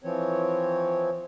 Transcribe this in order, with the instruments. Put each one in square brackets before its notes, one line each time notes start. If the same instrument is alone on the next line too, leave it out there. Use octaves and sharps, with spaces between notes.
[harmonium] E3 F3 C4 C#5